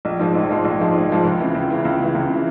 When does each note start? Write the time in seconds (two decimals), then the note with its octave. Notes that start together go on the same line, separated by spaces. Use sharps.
0.05 A#1
0.19 G#2 F3 G#3
0.35 A#1
0.49 G#2 F3 G#3
0.65 A#1
0.79 G#2 F3 G#3
0.94 A#1
1.09 G#2 F3 G#3
1.25 C#2
1.40 C#3 E3
1.55 C#2
1.70 C#3 E3
1.85 C#2
2.00 C#3 E3
2.15 C#2
2.30 C#3 E3